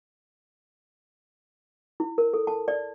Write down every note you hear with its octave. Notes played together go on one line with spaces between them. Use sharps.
E4
A#4
A4
A5
D5